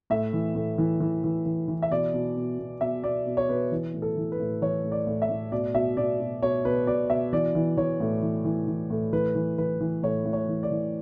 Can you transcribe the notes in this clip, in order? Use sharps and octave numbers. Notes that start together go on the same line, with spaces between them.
A2 E5
E3
A2
E3
E3
E3
E3
E3
E5
B2 D5
B2
B2
B2
B2 E5
B2 D5
B2
C#5
B2 B4
E3
A2
A4
E3
B4
A2
E3 C#5
A2
D5
A2
E5
A2
B2 D5
B2 E5
B2 D5
B2
B2 C#5
B2 B4
B2 D5
B2 E5
E3 D5
E3
E3 C#5
A2
E3
E3
E3
A2
E3 B4
E3
E3 B4
E3
A2 C#5
A2
C#5
E3
D5
E3